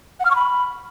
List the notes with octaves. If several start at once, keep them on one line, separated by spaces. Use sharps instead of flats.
F#5
F6
C#6
B5